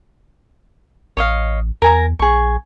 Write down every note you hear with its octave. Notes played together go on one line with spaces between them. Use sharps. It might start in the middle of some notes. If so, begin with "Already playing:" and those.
A1 C#5 D#5 F5
E2 A#4 G#5 A#5
A#1 G#4 C#6